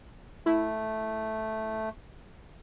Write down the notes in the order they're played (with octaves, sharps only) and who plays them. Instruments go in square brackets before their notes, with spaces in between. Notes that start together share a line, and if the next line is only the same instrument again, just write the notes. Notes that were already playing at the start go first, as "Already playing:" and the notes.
[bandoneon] A3 [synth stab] E4